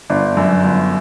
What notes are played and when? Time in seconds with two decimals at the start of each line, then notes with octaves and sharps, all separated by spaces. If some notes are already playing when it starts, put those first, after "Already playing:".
0.10 G1 D4
0.37 F#2
0.64 G1